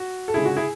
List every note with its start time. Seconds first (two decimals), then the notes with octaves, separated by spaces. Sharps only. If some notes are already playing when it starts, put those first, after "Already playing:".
Already playing: F#4
0.28 A4
0.34 D2 C#3 G#3 E4 G#4
0.45 F#4
0.56 E4 G#4